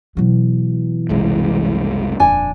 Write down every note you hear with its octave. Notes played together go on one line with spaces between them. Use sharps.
B2 E3 F#3
F#1 C2 G#3
D#1 F2 D4 G#5